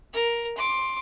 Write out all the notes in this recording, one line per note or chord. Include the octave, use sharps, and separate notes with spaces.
A#4
C6 D6